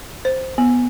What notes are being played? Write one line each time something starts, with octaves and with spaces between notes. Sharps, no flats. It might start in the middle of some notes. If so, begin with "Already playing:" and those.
C5
B3